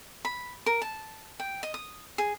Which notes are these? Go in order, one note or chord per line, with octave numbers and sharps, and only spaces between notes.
B5
A#4
A5
G5
D#5
D#6
G#4